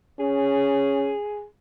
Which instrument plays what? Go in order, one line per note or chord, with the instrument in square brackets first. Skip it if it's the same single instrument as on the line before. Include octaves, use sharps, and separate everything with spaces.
[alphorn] C#4 [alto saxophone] G#4